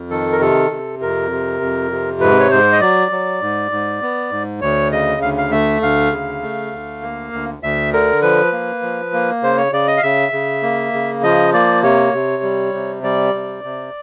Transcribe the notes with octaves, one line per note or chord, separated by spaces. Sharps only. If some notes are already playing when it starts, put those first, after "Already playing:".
Already playing: F2
D#3 A4
A#4
C3 A4
C3
F2 A#4
C3
F2
C3
G#2 B4
C#5
G#2 C5
D#5
F#3 D5
F#3
G#2
G#2
B3
G#2
D2 C#5
C#3 D#5
D2 F5
F5
A3 E5
D2 F5
C#3
A3
D2
A#3
D2
D2 E5
D3 A#4
F3 B4
A#3
F3
A#3
C#3 C5
C#5
C#3 D5
D#5
F5
C#3 E5
C#3
A#3
C#3
F3 D#5
A#3 D5
C3 C#5
C3
G3
C3
G3 D5
C3
C3